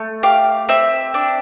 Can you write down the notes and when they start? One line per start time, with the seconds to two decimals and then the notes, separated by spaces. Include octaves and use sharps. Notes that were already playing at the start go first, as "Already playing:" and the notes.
Already playing: A3
0.23 G4 F5
0.69 C4 E5
1.14 D4